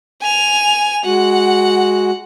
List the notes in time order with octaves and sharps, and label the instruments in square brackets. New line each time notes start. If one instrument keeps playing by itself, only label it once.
[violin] G#5 F7
[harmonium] G#3 F#4 [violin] F#5